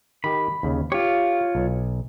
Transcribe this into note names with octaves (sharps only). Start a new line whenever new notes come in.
D#3 G4 B5
D#2 C#3
F4 G4 C#5
B1